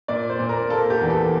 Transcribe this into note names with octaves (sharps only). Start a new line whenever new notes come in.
A#2 D5
C5
A#2
A#4
A#3 A4
G4
E2
A4